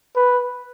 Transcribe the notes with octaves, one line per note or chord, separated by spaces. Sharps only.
B4